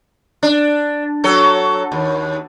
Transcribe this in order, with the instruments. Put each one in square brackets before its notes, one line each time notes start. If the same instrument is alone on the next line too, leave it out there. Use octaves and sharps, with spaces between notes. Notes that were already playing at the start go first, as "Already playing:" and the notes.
[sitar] D4
F#3 A4
D#2